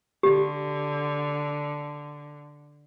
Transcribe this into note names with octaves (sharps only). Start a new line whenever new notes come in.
D3 G4